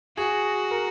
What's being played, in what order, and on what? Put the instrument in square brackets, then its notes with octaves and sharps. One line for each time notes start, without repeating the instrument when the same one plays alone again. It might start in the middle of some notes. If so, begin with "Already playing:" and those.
[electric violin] F#4 [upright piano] G#4
[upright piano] A#4